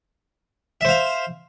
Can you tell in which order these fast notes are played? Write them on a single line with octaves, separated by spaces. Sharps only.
E5 C5 F5